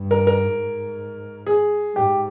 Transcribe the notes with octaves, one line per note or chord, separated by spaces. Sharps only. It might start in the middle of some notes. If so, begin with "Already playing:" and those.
Already playing: G2
A#4
A#4
G#2
G#4
G#2 G4